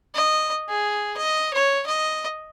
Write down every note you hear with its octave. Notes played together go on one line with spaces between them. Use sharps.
D#5
G#4
D#5
C#5
D#5